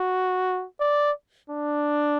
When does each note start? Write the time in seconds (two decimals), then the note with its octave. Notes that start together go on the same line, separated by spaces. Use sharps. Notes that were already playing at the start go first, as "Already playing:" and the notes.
Already playing: F#4
0.80 D5
1.50 D4